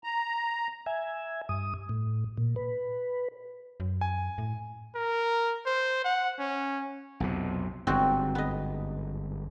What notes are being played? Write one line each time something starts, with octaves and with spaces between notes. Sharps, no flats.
A#5
E5 G#5
G2 D#6
A2
A#2
B4
F#2
G#5
A2
A#4
C5
F#5
C#4
B1 F2 C3
G1 G#2 C4 F#4
B3 D#5